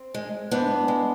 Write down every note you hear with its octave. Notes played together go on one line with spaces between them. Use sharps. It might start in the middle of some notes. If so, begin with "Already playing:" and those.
Already playing: C4
G#3
G#2 B3 D4
G#3